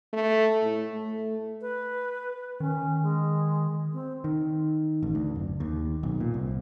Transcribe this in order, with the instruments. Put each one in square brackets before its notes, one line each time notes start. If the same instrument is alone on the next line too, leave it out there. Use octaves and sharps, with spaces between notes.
[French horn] A3
A2
A3
[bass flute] B4
[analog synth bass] D#3 [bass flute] C#4
[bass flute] G#3
C4
[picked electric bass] D#3
A1
D2
F#1
D#2
B1
A#2
C2